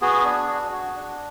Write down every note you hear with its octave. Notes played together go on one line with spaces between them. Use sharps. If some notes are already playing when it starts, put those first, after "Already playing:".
B3 F#4 G#4
D4
F#4
F#4
D4